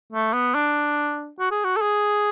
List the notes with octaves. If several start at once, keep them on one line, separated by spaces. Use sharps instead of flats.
A3
B3
D4
F#4
G#4
F#4
A4
G#4